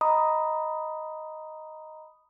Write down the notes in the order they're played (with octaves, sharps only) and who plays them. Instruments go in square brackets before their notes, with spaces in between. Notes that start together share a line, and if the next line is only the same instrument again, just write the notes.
[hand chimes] D#5 A#5 B5 D#6